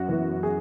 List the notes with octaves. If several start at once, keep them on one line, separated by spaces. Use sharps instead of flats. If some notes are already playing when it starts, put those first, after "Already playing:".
Already playing: F#2 F#4
E3 B3
G#4